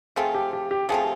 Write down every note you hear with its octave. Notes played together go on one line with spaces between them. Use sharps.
F3 A3 C4 F4 G#4
G4
G4
G4
F3 A3 C4 F4 G#4